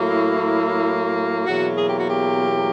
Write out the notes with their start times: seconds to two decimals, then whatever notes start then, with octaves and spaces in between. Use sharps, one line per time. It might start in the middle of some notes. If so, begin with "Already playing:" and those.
Already playing: A2 F#3 A#3
0.09 E4
1.46 E2 B2 F#3 A#3 F#4
1.78 G#4
1.88 G4
1.99 F#4
2.09 G4